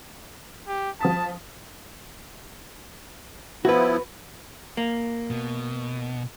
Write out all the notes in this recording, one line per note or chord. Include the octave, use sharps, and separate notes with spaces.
G4
F3 A5 D#6 B6
F3 B3 E4 F#4 B4
A#3
B2